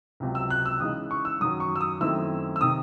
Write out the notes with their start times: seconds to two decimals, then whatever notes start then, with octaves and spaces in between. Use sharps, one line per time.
0.20 C#2 C3 F#3
0.35 E6
0.50 F#6
0.66 E6
0.80 C#3 E3 G#3 D#4 D#6
1.11 C#6
1.25 E6
1.40 F#2 D#3 F#3 D#6
1.60 C#6
1.76 E6
1.81 D#6
2.01 F#2 D#3 A3 C4 E4 E6
2.56 E6
2.61 C3 D#3 D#6